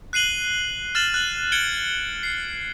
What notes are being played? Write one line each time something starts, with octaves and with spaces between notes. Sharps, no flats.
F#6 C7 D#7 F#7 G7
F6 A6 E7 F#7
F#6 F#7
G#6 C#7 D7 F#7 G7
C7